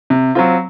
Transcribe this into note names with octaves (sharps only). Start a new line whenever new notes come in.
C3
F#3 C4 F4